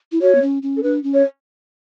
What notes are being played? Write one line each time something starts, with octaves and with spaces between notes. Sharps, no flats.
E4
F#4 C#5
B3
C#4
C#4
A4
D4 B4
C#4
C#5